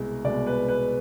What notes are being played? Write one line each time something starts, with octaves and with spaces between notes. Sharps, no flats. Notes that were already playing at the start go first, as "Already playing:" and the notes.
Already playing: C2 B2 G#3
C2 B2 G#3 D5
B4
B4